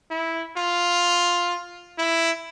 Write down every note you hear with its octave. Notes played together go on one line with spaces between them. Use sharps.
E4
F4
E4